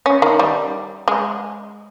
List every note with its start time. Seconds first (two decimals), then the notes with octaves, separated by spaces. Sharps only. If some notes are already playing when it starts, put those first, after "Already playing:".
0.06 C#4
0.22 D#3
0.39 G3
1.08 G#3